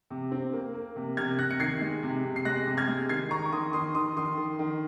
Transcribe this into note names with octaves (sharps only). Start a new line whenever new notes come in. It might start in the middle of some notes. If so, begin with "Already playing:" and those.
C3
C4
A#3
A#3
C3
C3 F6 G#6
C3 F#6 A#6
C#7
D#3 G#6 C7
G#3
C3
C3
C7
G#3 F#6 A#6
C3
F6 G#6
G#3
D#3 G#6 C7
D#3 A#5 C#6
C#6
D#3 C6 D#6
D#3 C6 D#6
D#3 C6 D#6
D#3 C6 D#6
D#3
D#3